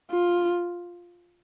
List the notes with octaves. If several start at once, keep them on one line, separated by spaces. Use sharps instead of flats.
F4